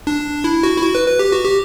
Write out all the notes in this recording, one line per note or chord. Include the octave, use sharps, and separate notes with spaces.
D4
E4
F#4
E4
F#4
B4
B4
G4
F#4
G4